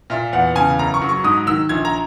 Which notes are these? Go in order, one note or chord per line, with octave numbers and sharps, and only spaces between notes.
A#2 E5
E2 F#5
C#3 G#5
F#1 A#5
C#6
F#3
C#6
G#2 D#6
D#3 E6
A#1 G#6
A#5